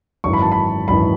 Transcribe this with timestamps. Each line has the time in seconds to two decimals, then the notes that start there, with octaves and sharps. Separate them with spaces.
0.24 G#1 F#2 E3 C#6
0.33 B5
0.42 A5
0.52 B5
0.88 G#1 F#2 E3 B5